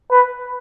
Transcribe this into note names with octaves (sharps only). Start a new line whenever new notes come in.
B4